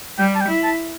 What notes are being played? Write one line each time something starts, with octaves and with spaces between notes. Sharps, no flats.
G3 G5
A5
G5
E4
A5